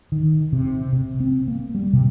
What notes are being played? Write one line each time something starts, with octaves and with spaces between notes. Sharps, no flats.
D#3
C3
C3
C4
A#3
G3
C3